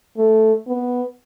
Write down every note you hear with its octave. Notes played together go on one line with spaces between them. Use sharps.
A3
B3